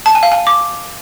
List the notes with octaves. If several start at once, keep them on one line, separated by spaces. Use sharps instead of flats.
A5
G#5
F5
G#5
D6